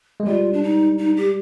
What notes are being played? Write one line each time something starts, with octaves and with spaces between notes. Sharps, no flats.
G#3
G3 F4
D4
D#4
D#4
G4